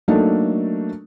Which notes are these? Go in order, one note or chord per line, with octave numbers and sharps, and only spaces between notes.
F#3 A3 A#3 D4 D#4 A4